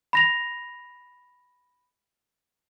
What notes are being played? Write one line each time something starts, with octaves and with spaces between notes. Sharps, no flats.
B5 A#6 F7